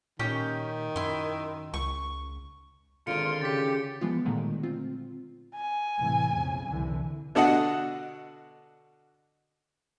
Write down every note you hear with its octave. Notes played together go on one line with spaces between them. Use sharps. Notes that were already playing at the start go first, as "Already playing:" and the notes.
A#2 D#3 C#4 G4 G5
F#2 E4 C6
C#2 C#6
G#1 D3 D#3 F4 C6 C#7 D7
C#3 G4 A6 B6
E3 F3 G#3 B3 F4
A#2 D3 D#3 F#3 G#3 A3
C4 F4
G#5
A2 C3 E3
B1 F2 C#3
C2 D3 E3
B2 D3 D4 F#4 D#5 F#5